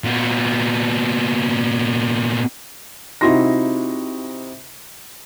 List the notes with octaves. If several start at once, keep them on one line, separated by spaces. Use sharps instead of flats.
A#2 B3
C3 D#4 E4 F#4 C6 A#6